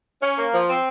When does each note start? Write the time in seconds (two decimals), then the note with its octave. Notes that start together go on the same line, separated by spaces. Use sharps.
0.21 C#4
0.37 A#3
0.53 F3
0.68 C4